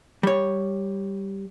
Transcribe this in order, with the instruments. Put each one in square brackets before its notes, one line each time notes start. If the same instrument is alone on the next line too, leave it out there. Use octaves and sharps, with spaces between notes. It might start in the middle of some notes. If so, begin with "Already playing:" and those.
[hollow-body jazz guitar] G3 C#5